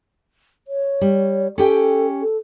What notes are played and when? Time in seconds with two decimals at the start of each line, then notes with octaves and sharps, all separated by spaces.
0.68 C#5
1.01 G3
1.58 C#4 G4 A4 G5
2.22 A4